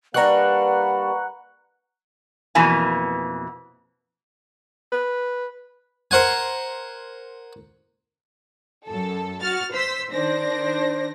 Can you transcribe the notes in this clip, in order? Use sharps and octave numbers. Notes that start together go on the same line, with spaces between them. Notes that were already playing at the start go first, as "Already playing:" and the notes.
G3 A#3 D4 B4 F#5 A#5 C#6 F#6
F2 B2 E3 A#3 G#5
B4
A#4 C5 F#5 G#5
F#2 A4
F#4 F6 A6
C5 E6 B6
D#3 D4 C5 A#6